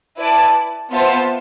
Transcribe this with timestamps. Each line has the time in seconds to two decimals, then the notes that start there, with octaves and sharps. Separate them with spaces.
0.17 E4 B4 D5 A5
0.90 B3 F4 C5 E5 A5